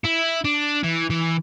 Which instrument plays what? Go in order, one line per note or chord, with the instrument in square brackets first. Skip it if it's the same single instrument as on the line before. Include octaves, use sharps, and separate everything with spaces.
[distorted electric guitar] E4
D4
E3
E3